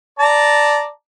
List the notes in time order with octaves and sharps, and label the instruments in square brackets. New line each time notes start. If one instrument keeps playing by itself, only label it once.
[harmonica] D5 A5 A#5